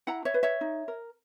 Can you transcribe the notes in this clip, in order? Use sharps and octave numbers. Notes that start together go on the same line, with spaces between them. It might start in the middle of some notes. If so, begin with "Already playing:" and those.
E4 F#5 A#5
C#5 E5
B4
C#5 E5
D#4
A#4